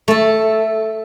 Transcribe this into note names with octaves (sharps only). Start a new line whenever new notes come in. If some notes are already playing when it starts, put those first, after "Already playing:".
A3 A4